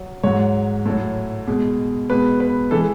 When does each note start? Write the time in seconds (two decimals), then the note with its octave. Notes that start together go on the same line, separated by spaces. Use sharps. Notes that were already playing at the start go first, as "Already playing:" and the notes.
Already playing: F#3
0.23 G#2 F#3 C#5
0.86 A2 F#3
1.47 B2 G#3
2.09 B2 G#3 B4
2.40 B4
2.71 E3 G#3 A4